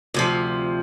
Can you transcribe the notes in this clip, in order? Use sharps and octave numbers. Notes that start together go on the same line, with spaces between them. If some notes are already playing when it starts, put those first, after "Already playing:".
D2 C3 F3